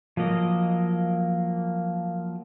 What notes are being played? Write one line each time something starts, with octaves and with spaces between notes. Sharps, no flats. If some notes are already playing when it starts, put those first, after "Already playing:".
F3 F#3 A#3 D#5